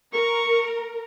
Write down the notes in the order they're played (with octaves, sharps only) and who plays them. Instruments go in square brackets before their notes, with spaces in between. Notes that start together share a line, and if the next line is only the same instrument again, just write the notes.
[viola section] A#4 [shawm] C#6